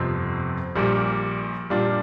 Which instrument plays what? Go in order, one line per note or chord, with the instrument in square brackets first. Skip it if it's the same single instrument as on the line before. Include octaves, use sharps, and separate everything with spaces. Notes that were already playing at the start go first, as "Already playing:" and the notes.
Already playing: [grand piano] G1 F2 C3 F3 C4
A#1 A#2 G3
A#2 G3 D4 F4